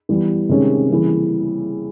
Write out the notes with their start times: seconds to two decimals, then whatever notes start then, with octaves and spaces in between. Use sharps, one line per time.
0.09 E3 G3 B3
0.49 C3 D#3 G#3 C#4
0.90 C#3 E3 G3 A#3